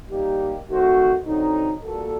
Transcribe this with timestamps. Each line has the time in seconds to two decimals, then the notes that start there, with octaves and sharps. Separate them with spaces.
0.10 G3 A#3 D#4 G4
0.68 D#3 A3 C4 F#4 C5
1.26 D3 F#3 C4 D#4
1.83 A#2 G3 A#3 F#4 A4